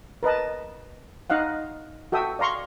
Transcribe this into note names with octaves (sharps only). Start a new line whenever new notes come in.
A#4 B4 D#5 A5
D#4 D#5 F5 F#5
F#4 A4 E5 G5 D#6
D5 F5 A#5 C6 C#6